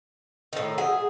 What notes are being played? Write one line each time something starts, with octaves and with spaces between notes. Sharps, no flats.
A2 D#3
G#4 F#5